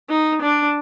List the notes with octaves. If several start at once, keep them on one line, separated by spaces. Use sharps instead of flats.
D#4
D4